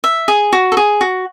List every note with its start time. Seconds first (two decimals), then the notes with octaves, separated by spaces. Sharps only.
0.04 E5
0.28 G#4
0.53 F#4
0.72 A4
0.77 G#4
1.01 F#4